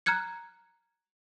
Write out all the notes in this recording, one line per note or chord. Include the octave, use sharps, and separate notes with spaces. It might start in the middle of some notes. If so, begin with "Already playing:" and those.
A#5 F6 F#6 G#6 C#7